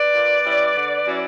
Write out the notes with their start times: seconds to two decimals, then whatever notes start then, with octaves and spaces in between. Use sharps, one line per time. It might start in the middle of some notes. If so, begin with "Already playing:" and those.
Already playing: B4 D5
0.14 A#2
0.44 G3 C#4 E4
0.75 D3
1.05 F#3 C#4 E4